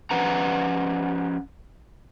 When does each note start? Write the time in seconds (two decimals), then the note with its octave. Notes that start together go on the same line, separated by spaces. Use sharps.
0.11 F3 C#4 B4 F#5 A#5